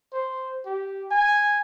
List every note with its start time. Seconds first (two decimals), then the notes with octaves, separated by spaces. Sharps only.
0.14 C5
0.66 G4
1.11 G#5